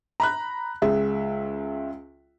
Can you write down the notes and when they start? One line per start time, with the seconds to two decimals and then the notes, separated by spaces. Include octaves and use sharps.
0.20 A#5 B5 F#6
0.82 C#2 G#3 E5